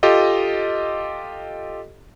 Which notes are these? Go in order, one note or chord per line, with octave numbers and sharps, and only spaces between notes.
F4 G4 A4 D#5